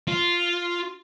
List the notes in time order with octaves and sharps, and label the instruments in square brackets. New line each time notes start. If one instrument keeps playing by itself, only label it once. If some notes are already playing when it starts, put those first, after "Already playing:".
[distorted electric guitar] F4